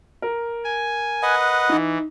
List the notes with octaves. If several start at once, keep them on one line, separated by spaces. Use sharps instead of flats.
A#4
G#5
B4 D#5 F#5
E3 D#4